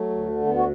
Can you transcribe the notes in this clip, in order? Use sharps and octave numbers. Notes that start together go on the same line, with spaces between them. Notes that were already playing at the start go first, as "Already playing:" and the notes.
Already playing: F#3 A3
D2
D3
D2 B3
F#4